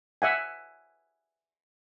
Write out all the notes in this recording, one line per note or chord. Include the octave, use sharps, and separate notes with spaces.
E5 F#5 G#5